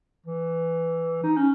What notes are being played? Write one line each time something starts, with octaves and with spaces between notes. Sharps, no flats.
E3
D#4
C#4